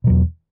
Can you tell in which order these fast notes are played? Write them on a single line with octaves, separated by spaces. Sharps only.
B2 F#3 E2